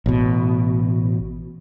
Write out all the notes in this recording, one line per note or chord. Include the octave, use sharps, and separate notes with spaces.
A1 B2